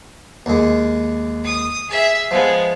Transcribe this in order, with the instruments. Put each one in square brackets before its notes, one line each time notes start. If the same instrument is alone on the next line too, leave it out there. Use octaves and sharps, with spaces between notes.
[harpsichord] D#2 G#3
[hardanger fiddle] D#6
G#4 E5
[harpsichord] F3 [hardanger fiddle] G#3 B3